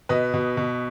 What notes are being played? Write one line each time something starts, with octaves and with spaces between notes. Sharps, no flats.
B2 B4 D#5
B2
B2